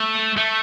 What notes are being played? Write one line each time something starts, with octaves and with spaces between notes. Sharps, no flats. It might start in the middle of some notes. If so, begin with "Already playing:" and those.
Already playing: A3
A3